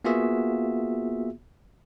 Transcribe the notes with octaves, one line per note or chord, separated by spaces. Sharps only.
A#3 B3 F4 F#4 G#4 E5